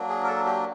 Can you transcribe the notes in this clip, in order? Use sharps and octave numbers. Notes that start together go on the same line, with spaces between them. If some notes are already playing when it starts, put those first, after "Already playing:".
Already playing: F#3 A#3 D4
G#4
A#4
A4
G4